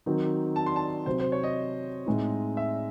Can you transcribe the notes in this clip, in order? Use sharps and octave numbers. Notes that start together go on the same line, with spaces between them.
D#3 F#3 C4 D#4
A5
C6
A5
C3 F#3 C4 C5
C5
C#5
D#5
A2 G#3 C4 D#4
E5